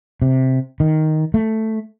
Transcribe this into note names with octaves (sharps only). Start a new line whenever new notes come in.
C3
D#3
A3